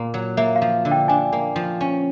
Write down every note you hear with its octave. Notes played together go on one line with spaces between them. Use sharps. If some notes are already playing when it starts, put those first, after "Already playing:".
Already playing: A#2 A#3
F#3
A#3 E5
F5
F3
D3
G5
D4 G#5
A#3
F3
C#4